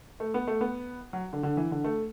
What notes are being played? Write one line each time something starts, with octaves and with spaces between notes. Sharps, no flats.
A3
B3
A3
B3
F#3
D3
D3
E3
D3
A3